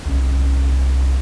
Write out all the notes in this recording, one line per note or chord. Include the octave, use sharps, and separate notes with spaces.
C2 C#4